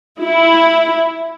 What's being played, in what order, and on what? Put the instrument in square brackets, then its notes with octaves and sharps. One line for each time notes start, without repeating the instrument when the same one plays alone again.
[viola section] E4